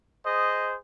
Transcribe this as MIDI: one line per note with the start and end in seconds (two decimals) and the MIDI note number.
0.24 0.76 68
0.24 0.76 72
0.24 0.76 75